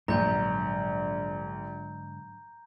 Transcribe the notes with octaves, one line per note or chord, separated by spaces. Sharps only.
A#1 G#2 D3 F#3 G5 A#5 G6